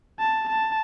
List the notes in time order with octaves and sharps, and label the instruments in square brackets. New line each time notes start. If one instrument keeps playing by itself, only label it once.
[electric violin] A5
A5